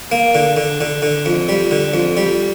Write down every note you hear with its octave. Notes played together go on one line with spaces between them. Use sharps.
A#3
D3
D3
D3
D3
F2
G3
D3
F2
G3